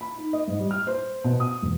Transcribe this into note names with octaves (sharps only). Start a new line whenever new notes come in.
B5
D#4
D#5
G#2
G3
F6
C5
B2
D#6
E1